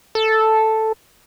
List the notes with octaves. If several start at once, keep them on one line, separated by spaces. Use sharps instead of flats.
A4